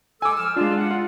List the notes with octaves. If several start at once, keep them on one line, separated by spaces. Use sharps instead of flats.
G#3 A4 G#5 D6 E6
F3 E6 F6
G#3 D4 F4
F#5
F4